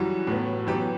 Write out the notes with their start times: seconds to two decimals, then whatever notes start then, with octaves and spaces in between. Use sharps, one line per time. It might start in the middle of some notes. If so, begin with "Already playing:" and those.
Already playing: F#2 E3 G3 F#4
0.27 A2 F#3 B3
0.67 F#2 E3 B3 G4